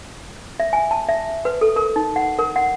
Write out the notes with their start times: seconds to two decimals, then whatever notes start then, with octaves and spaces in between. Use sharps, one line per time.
0.60 E5
0.73 G#5
0.91 A5
1.09 E5
1.45 B4
1.61 A4
1.76 A#4
1.96 D#4
2.16 F#5
2.39 A#4
2.56 F#5